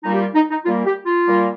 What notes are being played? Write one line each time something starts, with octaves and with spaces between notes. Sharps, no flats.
A#2 G3 A#3 D#4
G4
F4
D#4
D#4
A#2 G3 A#3 F4
G4
F4
A#2 G3 A#3